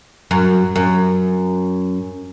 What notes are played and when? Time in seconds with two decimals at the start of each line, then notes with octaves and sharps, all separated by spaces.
0.31 F#2
0.76 F#2